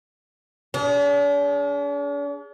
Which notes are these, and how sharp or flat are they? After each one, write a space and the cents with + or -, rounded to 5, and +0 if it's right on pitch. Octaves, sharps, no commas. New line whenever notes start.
D4 -45 G#4 +0